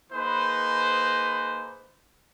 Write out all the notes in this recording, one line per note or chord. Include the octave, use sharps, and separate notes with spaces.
A#3 D#4 G#4 B4 C5